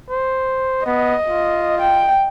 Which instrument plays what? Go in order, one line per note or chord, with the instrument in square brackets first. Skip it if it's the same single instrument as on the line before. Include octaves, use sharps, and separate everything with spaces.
[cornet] C5
[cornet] B3 [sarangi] D#5
[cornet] F4
[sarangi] G5